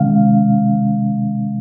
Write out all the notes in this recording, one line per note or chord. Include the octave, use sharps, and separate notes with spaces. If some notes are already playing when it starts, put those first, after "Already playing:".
Already playing: C3 D#3 G#3 C#4 F5